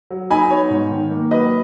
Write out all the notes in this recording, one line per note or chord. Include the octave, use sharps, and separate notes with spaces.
F#3
D#4 G#5 B5
B3 C#5
G#2
D#3
A#3
F#3 B4 D#5